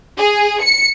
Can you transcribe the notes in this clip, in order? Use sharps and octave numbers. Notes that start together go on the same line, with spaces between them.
G#4
C#7